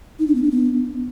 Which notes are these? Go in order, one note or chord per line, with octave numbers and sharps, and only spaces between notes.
D#4
D4
B3
D4
B3